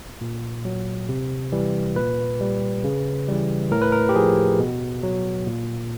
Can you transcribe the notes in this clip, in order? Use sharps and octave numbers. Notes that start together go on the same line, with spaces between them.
A#2
F#3
C3
E3 G3
A#2 B4
G3
C#3
E3 G3
A2 A#4
B4
A#4
G4
F3 G#4
B2
F#3
A#2